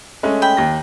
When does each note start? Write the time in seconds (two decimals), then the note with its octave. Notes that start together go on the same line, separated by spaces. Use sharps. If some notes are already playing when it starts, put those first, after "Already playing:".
0.23 G#3 A3 C#4
0.42 G5 B5
0.57 D#2 A#6